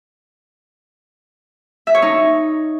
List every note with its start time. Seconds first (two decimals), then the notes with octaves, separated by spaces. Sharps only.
1.87 E5
1.95 C#5
2.02 D#4